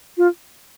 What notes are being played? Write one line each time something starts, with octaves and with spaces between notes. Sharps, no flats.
F4